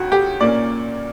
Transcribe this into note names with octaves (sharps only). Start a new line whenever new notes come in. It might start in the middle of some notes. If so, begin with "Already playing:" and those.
Already playing: C#2 C#3 F#4
G4
A#2 A#3 C#4 D5